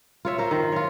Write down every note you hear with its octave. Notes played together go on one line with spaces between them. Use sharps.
F4 C#5 E5
F4 A#4 C5
D#3
F4 C#5